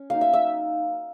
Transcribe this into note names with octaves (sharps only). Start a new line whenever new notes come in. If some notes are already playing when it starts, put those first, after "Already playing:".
Already playing: C#4
F#3 A#3 D#4 F5
E5
E5